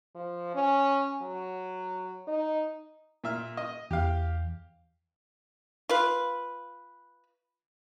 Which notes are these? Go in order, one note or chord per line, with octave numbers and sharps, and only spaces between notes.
F3
C#4
F#3
D#4
A#2 E5 F6
D#5
E2 G4 F5
F4 B4